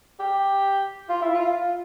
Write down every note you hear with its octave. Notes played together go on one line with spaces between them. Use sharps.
G4
F4
E4
F4